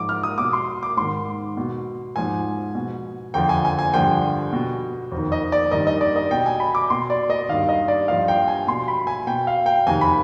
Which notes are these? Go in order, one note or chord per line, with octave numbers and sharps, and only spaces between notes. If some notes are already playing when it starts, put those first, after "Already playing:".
Already playing: G#2 F3 D6
F6
D#6
B2 D6
C6
D6
G#2 D#3 C6
B2
G#2 F3 G#5
B2
F2 D3 F3 G5
G#5
G#5
G#5
G2 D3 F3 G5
B2
F2
D#3
D#5
D5
G2 D#3 D#5
D#5
D5
D#5
B2 G5
G#5
B5
D6
B2 C6
D5
D#5
G2 D#3 F5
D#5
D5
G2 F3 F5
G5
G#5
B2 C6
B5
G#5
B2 G5
F5
G5
F2 C3 D#3 G#5
B5